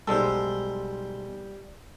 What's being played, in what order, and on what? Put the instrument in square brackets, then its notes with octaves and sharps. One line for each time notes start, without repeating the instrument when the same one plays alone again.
[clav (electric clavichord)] B1 G#3 A4 [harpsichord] G3 C5